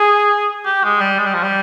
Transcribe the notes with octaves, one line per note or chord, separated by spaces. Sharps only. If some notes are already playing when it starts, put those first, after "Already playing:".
Already playing: G#4
G4
G#3
G3
G#3
G3
F3
G3